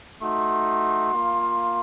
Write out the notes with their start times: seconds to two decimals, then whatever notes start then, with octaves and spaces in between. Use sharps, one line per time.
0.21 A3 D#4 F#4 C6
1.14 A#3 F4